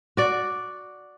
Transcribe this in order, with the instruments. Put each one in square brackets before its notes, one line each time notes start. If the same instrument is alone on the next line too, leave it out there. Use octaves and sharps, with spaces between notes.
[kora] F#4 D5